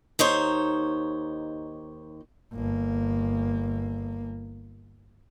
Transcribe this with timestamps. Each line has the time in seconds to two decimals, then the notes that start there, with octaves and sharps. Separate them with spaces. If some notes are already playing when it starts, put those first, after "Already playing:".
0.19 D#2 D#4 C5 C#5
2.53 G1 A#3